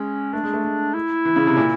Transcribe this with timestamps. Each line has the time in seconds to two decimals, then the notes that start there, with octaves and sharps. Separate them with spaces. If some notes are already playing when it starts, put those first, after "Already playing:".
Already playing: G#3 C#4
0.33 A3 D4
0.44 G#3
0.53 A3
0.65 G#3
0.95 E4
1.25 E3
1.36 C#3
1.47 C3
1.57 A#2